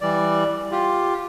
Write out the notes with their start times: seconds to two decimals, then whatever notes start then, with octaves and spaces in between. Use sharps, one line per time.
0.01 E3 G3 D5
0.71 F4 G4